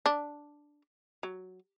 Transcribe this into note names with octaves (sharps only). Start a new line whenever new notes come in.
D4
F#3